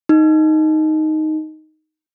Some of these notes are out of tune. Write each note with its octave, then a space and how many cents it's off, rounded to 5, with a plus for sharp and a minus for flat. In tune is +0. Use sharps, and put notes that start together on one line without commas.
D#4 +0